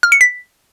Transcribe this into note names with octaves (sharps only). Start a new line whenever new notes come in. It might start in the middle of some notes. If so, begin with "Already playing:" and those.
F6
C#7
B6